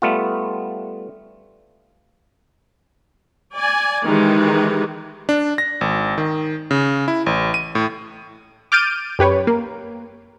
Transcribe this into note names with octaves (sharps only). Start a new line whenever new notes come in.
G3 A3 B3 F4
D5 G#5
D#3 E3 G#3 G4
D4
A#6
G#1
D#3
C#3
E4
A1
D#7
A2
D6 F6 G6 A6 D7 D#7
F#2 G4 B4 C#5
A#3